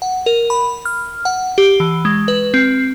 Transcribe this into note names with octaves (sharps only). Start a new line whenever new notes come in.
F#5
A#4
B5
F6
F#5
G4
E3
G#3
B4
C4